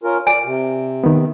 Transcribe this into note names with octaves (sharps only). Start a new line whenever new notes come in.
C#4 F4 A#4
D5 G#5
C3
D#3 B3